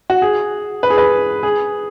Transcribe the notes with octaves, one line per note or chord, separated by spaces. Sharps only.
F#4
G#4
B4
G#4
B4
G#4